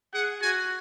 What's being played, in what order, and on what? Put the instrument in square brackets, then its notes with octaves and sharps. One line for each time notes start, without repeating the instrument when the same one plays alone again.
[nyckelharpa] G#4 [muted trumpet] F#5
[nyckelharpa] F#4 [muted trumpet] G#5